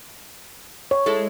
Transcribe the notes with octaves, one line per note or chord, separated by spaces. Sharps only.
C#5
G#3 E4 A4